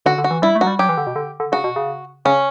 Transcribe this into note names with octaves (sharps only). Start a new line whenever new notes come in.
D3 F#4
D3
F#4
E3
G3 E4
A3
F#3 F#4
G3
F#3 G4
E3
D3
B2
D3
D3
C#3 F#4
B2
C#3
C#3 C#4